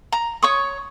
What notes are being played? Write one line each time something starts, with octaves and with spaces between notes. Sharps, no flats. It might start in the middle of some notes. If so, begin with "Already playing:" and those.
A#5
C#5 C#6 D#6